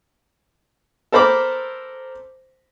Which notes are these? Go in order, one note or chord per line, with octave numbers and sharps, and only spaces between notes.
A4 A#4 C5 B5 D6